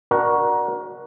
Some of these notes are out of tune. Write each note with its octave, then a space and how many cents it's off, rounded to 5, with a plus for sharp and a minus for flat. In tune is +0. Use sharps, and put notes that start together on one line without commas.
D4 +20 F#4 +0 A#4 +25